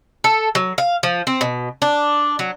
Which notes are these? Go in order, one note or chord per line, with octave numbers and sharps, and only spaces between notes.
A4
F#3
F5
F3
C4
B2
D4
F#3